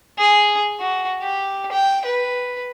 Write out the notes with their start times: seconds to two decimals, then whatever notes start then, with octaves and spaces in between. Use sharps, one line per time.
0.18 G#4
0.80 F#4
1.22 G4
1.72 G5
2.05 B4